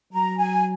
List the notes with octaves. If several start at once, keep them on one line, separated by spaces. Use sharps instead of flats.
F#3 A#5
G#5